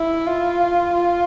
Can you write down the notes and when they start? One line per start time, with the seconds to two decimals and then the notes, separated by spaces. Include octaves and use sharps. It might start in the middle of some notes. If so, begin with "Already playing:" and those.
Already playing: E4
0.27 F4
0.93 F4